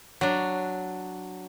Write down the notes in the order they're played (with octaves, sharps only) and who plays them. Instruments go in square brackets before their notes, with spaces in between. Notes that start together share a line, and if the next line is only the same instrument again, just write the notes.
[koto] F#3 D4